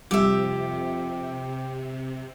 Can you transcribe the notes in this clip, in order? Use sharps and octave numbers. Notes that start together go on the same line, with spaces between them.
G1 F2 C3 G3 G4 E5